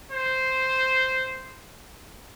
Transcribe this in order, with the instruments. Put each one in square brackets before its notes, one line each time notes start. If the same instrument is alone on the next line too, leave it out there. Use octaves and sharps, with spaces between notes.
[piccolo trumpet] C5